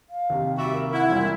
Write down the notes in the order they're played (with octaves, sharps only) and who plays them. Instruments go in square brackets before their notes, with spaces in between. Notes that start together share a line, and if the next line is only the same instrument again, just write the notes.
[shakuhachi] F5
[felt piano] D#2 C3
[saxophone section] G3 F#4 E5
[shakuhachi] A#4
[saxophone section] E4 [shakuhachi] F#5
[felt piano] E1 C2 [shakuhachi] F4